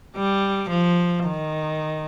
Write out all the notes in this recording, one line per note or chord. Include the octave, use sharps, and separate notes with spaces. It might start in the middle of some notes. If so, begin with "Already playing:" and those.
G3
F3
D#3